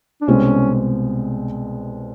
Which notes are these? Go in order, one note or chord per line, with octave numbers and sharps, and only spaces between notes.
D4
C2 B2 G#3 C4 C#4